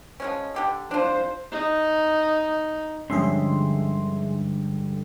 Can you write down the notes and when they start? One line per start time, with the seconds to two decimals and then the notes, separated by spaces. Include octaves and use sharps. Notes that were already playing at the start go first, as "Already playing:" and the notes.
0.20 F3 G#3 C#4
0.55 D3 G4 A4
0.91 D4 F4 C5
1.52 D#4
3.10 G2 D3 F3 G#3 C#4 G#4 E5 C6